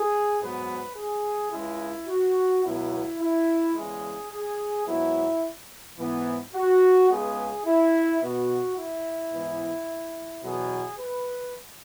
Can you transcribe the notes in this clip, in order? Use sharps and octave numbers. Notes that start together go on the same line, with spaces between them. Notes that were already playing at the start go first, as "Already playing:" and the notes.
Already playing: G#4
G#2 F#3 B3 B4
G#4
C#2 C#3 G#3 E4
F#4
C#2 B2 F#3 B3 E4
E4
E2 C#3 G#3 G#4
G#4
G#2 F#3 B3 E4
G#2 E3 B3
F#4
C#2 C#3 G#3 B3 G#4
E4
B2 B3 F#4
E4
G#2 E3 B3
E2 B2 F#3 B3 G#4
B4